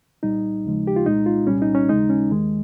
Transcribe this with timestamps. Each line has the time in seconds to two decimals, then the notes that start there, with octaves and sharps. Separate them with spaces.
0.23 C2 A#2 G3 D#4
0.65 D#2 C#3 F3 G#3
0.87 G4
0.96 F4
1.06 C2 A#2 G#3 D#4
1.26 F4
1.47 C2 A#2 G3 C#4
1.62 D#4
1.75 C#4
1.89 D#2 C#3 G#3 D#4
2.10 C#4
2.30 D#2 D#3 G#3